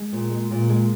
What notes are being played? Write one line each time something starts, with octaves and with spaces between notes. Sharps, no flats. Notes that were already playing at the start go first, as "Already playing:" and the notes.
Already playing: G#3
A#2
G#3
A#2
G#3